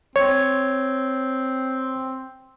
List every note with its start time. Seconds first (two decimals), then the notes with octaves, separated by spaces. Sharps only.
0.16 C4 C#5 G#6